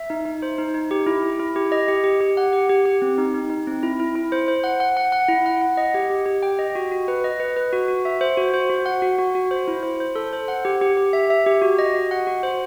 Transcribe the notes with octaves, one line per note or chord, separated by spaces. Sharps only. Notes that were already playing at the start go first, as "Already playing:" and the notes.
Already playing: E5
D#4
D#4
C5
D#4
D#4
G4
E4
E4
E4
G4
D#5
G4
G4
G4
F#5
G4
G4
G4
C4
D#4
D#4
D#4
C4
E4
E4
E4
C5
C5
F#5
F#5
F#5
F#5
E4
F#5
F#5
D#5
G4
G4
G4
G5
D#5
F#4
F#4
B4
D#5
B4
B4
F#4
F#4
E5
C5
F#4
C5
F#4
F#5
F#4
F#4
F#4
C5
E4
C5
C5
A4
C5
F#5
G4
G4
G4
E5
E5
G4
F#4
D#5
F#4
F#5
F#4
C5